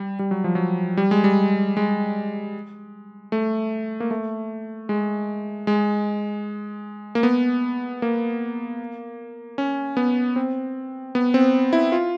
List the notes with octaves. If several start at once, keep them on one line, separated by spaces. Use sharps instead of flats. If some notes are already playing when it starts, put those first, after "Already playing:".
Already playing: G3
G3
F#3
F3
F#3
G3
G#3
G3
G#3
A3
A#3
A3
G#3
G#3
A#3
B3
A#3
C#4
B3
C4
B3
C4
E4
F4